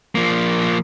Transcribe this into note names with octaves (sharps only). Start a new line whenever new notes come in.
F3 A#3